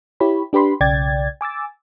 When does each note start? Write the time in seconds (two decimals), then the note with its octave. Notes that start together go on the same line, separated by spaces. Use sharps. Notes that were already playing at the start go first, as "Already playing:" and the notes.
0.20 E4 G4 C#5 B5
0.53 D4 G4 B4 B5 C6
0.81 B1 C#3 D5 G5 G#6 A6
1.41 G#5 D6 E6 A6